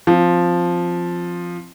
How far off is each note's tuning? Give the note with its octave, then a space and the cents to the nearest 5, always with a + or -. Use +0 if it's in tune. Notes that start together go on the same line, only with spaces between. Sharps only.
F3 +0 C4 +0